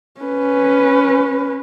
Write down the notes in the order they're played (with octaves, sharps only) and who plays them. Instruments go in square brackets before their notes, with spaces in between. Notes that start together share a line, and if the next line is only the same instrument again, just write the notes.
[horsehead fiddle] C#4 B4